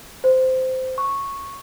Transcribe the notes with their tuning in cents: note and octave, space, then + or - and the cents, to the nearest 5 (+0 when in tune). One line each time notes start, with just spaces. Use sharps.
C5 -15
C#6 -5